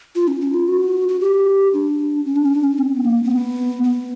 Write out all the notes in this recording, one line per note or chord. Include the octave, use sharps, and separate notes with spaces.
F4
C#4
C#4
F4
F#4
F#4
G4
D4
C#4
D4
C#4
D4
C#4
C4
B3
A#3
C4
B3
B3